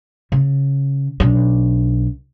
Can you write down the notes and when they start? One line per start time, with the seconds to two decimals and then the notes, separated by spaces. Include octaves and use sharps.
0.32 C#3
1.20 B1 D4